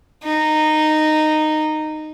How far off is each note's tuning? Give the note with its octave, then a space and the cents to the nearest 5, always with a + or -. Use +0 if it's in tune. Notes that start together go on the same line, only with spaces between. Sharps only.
D#4 -10